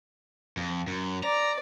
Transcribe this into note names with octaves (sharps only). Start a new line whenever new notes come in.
F2
F#2
D5 A#5